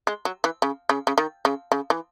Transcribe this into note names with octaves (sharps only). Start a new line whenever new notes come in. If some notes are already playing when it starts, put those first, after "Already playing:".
G#3
F#3
E3
C#3
C#3
C#3
D#3
C#3
C#3
E3